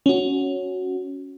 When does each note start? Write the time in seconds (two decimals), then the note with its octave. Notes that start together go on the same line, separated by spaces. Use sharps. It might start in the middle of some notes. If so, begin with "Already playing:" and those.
0.06 C#4 F#4